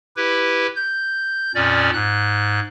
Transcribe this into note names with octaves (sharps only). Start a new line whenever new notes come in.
E4 G4 B4
G6
F2 A#2 C#4 D5
G#2 F#6